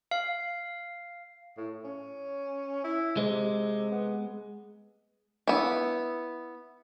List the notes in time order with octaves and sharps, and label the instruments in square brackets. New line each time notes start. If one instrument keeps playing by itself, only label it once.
[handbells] F5
[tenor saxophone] A2
C#4
E4
[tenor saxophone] C3 [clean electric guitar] G#3
[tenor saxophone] B3
[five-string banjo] B3 E4